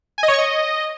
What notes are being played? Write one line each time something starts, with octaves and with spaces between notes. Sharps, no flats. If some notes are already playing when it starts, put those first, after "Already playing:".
G#5
D#5
C#5
C#6
D#5